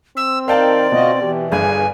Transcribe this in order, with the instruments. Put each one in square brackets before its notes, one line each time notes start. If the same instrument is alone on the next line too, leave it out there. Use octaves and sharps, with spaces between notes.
[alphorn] C4 [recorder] E6
[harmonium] D#3 A#4 [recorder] D5 [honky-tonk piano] F5 G5 A5
[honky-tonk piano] B2 [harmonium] F4 F#4 D#5
[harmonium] E3 [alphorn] G4
[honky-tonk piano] G1 G2 B4 [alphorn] G#4 [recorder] G#5